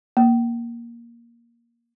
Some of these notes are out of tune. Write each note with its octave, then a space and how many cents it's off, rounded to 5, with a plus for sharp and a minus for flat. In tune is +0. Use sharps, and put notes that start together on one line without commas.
A#3 +10